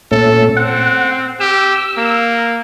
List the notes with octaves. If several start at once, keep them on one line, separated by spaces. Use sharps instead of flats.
A#2 A3 C#4 A4
C4 F#5
G4 E6
A#3